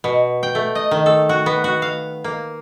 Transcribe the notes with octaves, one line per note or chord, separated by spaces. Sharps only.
B2
G5
A3
D#5
D#3
A4
F#4
B3
F#4
F5
A#3